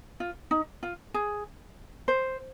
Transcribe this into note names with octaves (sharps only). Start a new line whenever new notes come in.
F4
D#4
F4
G#4
C5